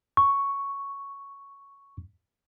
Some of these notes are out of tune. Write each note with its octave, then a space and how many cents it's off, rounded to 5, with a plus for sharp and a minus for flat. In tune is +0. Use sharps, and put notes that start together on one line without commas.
C#6 +0